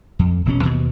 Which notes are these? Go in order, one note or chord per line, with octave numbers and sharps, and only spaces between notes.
F2
E1 B2 C#4
D#2 B2